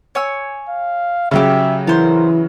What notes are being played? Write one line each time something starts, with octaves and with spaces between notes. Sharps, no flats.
C#5 G#5 E6
F5
C#3 F#3 C#4 F#4 G4 E5
E3 B3 A#4 C5